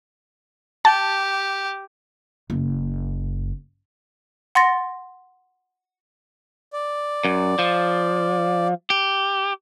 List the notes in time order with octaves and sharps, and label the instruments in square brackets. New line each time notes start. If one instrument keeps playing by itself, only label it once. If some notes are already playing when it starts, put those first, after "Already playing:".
[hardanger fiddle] G4 [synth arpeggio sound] A5
[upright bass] F#1
[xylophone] F#5 C6 A6 A#6
[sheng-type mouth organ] D5
[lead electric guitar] F#2
F3
G4